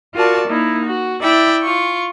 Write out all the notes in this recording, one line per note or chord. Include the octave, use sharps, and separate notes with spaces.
F4 F#4 A#4 D5 A5
A#3 D#4 E4
F#4
E4 D5 E5 G5
F4 C#6